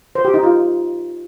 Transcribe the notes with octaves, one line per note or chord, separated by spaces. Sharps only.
C5
G4
D#4
F4